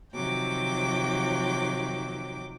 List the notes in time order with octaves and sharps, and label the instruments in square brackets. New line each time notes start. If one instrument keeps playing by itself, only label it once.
[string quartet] C3 D#3 F3 F#3 G5 D6